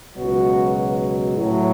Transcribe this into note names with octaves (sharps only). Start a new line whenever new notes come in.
C#2 B2 F#3 F#4
A2 F#3